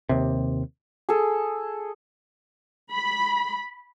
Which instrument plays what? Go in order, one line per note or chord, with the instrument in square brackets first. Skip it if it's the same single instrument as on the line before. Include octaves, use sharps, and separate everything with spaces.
[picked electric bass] D#2 C3
[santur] G#4 A4
[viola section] B5